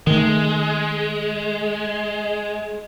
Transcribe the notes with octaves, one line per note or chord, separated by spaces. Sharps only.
D#3 G#3 A3